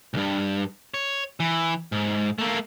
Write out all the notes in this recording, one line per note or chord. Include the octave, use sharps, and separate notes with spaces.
C2 G2
C#5
E3
G#2
A3 A#3